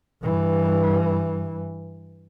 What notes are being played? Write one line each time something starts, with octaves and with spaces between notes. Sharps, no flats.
G2 E3